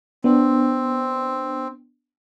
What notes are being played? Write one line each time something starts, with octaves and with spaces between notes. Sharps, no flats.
B3 C4 D4